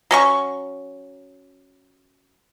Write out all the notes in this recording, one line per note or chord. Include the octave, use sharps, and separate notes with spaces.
F#3 C#4 C#6